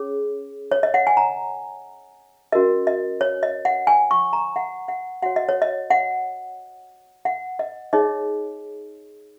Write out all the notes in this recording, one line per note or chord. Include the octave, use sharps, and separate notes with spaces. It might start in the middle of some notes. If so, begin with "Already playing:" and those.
Already playing: C#4 G#4 C#5
C#5
D#5
F#5
G#5
A#5
C#4 F#4 A#4 D#5
D#5
C#5
D#5
F#5
G#5
C#6
A#5
F#5
F#5
F#4 C#5 F#5
D#5
C#5
D#5
F#5
F#5
D#5
D#4 G#4 C#5 D#5